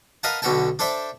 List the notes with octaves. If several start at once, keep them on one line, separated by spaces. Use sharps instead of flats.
A#4 B4 D#5 F5 F#5 A5
B1 B2 D3 A4 G5 A5
D4 A4 C5 D5 E5 G5